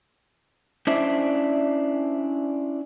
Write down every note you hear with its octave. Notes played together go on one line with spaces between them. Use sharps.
C#4 D4 E4 C5 D5 E5